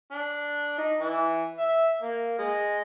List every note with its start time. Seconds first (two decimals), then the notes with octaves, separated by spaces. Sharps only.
0.11 D4
0.78 D#4
1.00 E3
1.58 E5
2.02 A#3
2.38 G#3